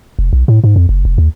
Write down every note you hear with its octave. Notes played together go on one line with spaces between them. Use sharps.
F1
B1
A2
G#2
F2
F#1
F1
D#2